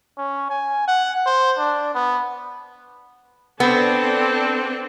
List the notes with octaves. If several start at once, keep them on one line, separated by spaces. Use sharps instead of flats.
C#4
G#5
F#5
C5
D4
B3
B3 C4 D4 A4